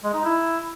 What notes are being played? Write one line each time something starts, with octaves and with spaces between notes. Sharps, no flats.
G#3
D#4
E4